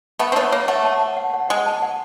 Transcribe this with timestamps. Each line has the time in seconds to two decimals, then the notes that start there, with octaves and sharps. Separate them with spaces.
0.19 A3 B3 F#5
0.32 C4
0.36 A3 B3 C#5
0.52 A#3 C#5
0.68 A3 F#5
0.85 A5
1.01 F#5
1.17 F#5
1.34 F#5
1.49 G#3 F#5
1.66 A5
1.82 F#5